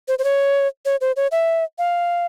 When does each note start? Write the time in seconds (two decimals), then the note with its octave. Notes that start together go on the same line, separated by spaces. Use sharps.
0.08 C5
0.19 C5
0.24 C#5
0.85 C#5
1.01 C5
1.16 C#5
1.32 E5
1.78 F5